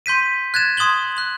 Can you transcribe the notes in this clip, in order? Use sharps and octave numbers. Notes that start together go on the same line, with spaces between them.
C6 G6 B6 D#7
F#6 G#6 A6 E7
C6 D#6 G#6 F#7 G7
F#6 F#7